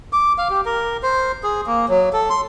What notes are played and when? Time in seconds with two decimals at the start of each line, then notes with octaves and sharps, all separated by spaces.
0.13 D6
0.38 F5
0.50 G4
0.66 A#4
1.03 C5
1.43 G#4
1.67 A#3
1.89 F#3
2.13 A4
2.30 C6